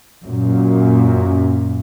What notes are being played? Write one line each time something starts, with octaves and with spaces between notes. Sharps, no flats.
F#2 A#2